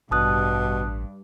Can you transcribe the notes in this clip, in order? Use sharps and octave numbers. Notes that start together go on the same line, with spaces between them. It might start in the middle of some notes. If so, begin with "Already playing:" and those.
A1 G2 B2 A5 D#6 F#6